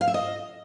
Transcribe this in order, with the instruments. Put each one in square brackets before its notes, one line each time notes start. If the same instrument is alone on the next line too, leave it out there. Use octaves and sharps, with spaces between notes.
[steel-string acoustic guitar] F5
E5
D#5